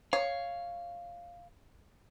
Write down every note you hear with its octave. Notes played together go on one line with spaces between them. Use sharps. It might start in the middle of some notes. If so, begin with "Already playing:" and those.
C#5 F5